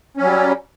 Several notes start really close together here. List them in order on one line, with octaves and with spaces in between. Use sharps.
C#4 F#3 G3